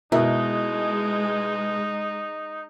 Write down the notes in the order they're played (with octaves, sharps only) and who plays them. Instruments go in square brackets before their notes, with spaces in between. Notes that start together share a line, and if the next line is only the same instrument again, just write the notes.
[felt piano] B2 E5 [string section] G#3 [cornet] D#4 [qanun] E4 F#4 A#4